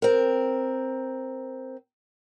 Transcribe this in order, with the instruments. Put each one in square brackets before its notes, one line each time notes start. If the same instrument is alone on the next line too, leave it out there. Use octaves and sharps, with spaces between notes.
[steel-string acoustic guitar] C4 A#4